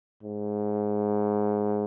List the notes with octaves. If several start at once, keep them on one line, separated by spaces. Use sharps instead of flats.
G#2